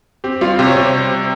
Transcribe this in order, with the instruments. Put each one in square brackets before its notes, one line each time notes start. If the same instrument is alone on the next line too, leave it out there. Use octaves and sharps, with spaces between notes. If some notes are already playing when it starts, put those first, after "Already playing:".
[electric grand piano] C4 [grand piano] G4
[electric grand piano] G3 [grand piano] F4
[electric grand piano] C3 [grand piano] G4
[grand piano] C#5
[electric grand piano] C3 [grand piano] C5